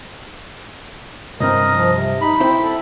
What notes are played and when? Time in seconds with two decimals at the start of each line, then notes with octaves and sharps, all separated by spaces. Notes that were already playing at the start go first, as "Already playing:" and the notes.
1.40 C2 G2 C4 A#4 D#5
1.75 F3
1.93 C3
2.21 D#4 B5
2.40 C4 E4 C5
2.60 A4